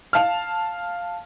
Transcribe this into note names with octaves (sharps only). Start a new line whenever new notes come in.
F5 A5 F6